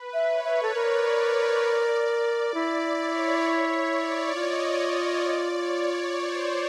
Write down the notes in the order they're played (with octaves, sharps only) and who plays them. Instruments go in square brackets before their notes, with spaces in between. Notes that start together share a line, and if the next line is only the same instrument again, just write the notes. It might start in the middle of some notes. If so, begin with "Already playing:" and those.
Already playing: [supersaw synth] B4
[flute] E5
[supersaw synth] C#5
[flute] E5
A4
[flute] A#4 [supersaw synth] D5
[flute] E4 [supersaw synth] D5
[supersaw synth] C#5
C#5
D5
[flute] F4 [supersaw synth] D#5
[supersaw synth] D5
D5
C#5
C#5
C5